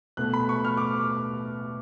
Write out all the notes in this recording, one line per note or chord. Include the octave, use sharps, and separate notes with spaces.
B2 A3 F#6
B5
C#6
F6
D6